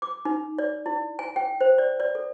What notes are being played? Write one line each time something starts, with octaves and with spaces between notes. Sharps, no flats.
D6
D#4
D5
E4
G#5
G5
C5
D5
D5
A4